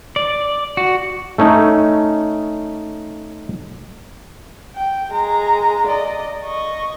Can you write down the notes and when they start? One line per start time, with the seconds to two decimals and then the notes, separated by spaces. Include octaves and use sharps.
0.16 D5
0.77 F#4
1.38 A3 C#4 D#4
4.75 G5
5.11 G#3 A#5
5.87 D5 D#5
6.45 D#5 C#6